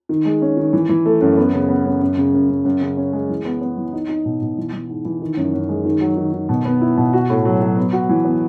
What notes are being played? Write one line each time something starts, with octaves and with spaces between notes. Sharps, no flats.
D#3
G#3
C#4
D#3
E3
E3
A3
F#2
B3
C#3
B3
F#2
F#2
C#3
F#2
F#2
F#2
C#3
C#4
G#3
E3
B3
B3
E3
D#4
D#4
B2
B2
E3
E3
G#2
E3
D#3
F#2
F#2
G#3
D#3
F#3
D#3
D#3
B2
B3
E4
B2
F#4
A2
F#3
F#3
B3
F#4
E3
B3